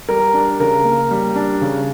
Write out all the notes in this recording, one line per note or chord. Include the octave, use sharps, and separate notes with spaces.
G3 A#4
D4
C#3 A#4
A#3
G3
D4
C#3